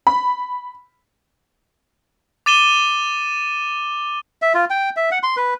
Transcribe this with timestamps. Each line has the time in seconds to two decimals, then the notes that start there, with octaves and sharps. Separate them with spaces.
0.07 B5
2.46 D6 A6 D#7 E7 G7
4.42 E5
4.54 F4
4.70 G5
4.97 E5
5.11 F#5
5.23 C6
5.37 B4